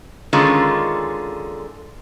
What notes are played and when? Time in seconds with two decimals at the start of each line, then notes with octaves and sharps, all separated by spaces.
0.33 D3 D#3 G#3 C#4 F4